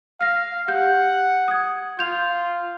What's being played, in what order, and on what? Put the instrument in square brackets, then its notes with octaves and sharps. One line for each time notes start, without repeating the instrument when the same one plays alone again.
[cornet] F5 [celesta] F6 A#6
[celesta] G4 G6 [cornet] F#5
[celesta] D#6 G#6
[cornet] F4 [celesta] G6 F7